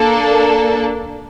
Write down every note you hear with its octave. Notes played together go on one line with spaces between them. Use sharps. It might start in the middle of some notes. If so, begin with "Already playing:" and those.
Already playing: A#3 D4 A4